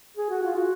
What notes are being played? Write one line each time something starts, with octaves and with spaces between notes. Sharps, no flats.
G#4
F#4
F4
F#4